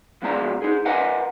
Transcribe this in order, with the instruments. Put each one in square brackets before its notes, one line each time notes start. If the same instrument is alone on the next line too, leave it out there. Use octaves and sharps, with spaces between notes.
[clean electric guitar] B1 F2 B2 G#3 D4 A#5
D#4 G#4
A#4 B4 D#5 F#5 G#5 A#5